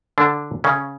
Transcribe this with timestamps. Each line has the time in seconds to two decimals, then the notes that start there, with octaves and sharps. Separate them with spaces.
0.18 D3 D4
0.64 C#3 C#4